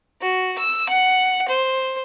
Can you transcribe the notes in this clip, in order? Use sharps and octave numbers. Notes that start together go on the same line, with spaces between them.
F#4
E6
F#5
C5